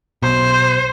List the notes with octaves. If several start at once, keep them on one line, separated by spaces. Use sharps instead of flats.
B1 B2 C5